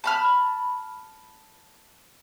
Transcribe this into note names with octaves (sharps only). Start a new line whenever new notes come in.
A5 B5 F6